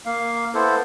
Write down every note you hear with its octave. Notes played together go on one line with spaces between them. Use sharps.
A#3 F5
B3 E4 A4 C5